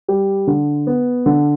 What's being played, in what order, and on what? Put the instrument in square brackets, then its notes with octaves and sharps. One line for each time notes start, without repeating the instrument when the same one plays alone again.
[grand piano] G3
D3
B3
D3